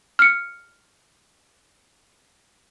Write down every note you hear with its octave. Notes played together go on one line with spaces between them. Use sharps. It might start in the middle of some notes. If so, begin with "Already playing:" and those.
F6 C#7